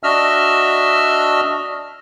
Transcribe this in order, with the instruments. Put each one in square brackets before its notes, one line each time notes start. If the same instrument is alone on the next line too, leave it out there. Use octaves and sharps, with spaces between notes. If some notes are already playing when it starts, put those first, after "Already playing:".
[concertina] D4 F#4 D#5 E5 E6 F6